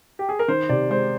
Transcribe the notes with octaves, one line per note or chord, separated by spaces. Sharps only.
G4
G#4
A#4
D#3 C5
C3 D5
G#3 C5